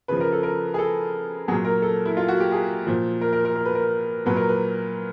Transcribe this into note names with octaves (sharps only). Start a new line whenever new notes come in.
C#3 F3 B4
A#4
A4
A#4
G#4
A4
A#2 F#3 G#4
A#4
A4
E4
F4
F#4
G4
G#4
A#2 F3
A#4
A#4
A#4
A#4
B4
A#4
A#2 F#3 B4
A#4
B4